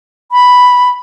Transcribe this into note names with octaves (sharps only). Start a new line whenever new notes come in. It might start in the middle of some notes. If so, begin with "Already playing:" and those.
B5